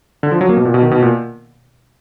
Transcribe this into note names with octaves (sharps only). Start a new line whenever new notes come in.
D3
F3
F#3
A#3
B2
A#2
B2
D#3
B2
A#2